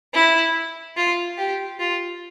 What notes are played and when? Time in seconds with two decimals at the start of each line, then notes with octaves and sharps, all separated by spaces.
0.14 E4
0.97 F4
1.38 G4
1.79 F4